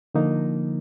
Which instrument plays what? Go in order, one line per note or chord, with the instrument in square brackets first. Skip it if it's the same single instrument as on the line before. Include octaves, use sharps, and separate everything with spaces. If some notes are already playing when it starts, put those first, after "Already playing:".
[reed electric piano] D3 F3 A#3 D#4